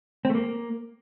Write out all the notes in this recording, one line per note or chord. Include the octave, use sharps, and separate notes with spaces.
C4
A3
A#3